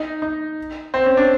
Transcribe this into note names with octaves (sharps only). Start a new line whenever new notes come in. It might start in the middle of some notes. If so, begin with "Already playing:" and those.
Already playing: D#4
D#4
C4
C#4
D4